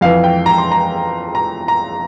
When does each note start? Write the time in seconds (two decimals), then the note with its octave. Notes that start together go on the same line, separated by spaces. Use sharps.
0.01 F2 E3 F5
0.24 G5
0.46 A#5
0.58 C6
0.72 A#5
1.35 A#5
1.68 A#5